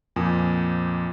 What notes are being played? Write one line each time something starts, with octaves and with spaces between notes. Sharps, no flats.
F2 A#2 G#5 D#6